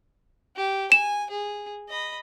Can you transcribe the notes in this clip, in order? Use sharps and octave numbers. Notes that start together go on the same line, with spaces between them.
G4
G#5 E7
G#4
D#5 B5